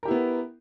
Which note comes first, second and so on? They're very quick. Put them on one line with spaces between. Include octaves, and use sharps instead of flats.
A#4 G4 E4 B3